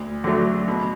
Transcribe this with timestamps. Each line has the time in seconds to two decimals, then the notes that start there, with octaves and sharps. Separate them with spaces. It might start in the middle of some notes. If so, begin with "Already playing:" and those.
Already playing: D2
0.24 D3 F#3 A3
0.68 B2